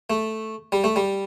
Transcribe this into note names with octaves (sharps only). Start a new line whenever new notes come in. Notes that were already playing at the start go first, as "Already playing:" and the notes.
A3
G3
A3
G3